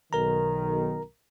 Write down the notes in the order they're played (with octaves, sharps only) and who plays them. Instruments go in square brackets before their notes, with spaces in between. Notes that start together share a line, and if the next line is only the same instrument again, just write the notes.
[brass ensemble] B1 D#3 [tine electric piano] A#4 A#5